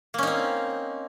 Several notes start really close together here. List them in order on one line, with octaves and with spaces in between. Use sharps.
A#3 C#4 D#4 C4